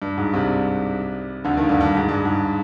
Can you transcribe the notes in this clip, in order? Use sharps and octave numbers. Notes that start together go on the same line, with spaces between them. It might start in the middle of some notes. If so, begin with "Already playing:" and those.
G2
G#2
C2 C3
D2 D3
D#2 D#3
G2
G2
G#2
G2
G#2